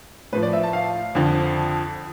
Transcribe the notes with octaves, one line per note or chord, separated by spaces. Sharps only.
A2 F3 B4
D5
E5
A5
F5
F2 D3 F3